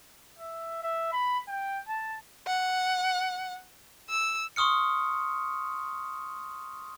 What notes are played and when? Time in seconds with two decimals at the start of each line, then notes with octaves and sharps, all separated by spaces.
0.39 E5
0.83 E5
1.12 B5
1.48 G5
1.88 A5
2.47 F#5
4.10 E6
4.56 C6 C#6 D#6 F6 C#7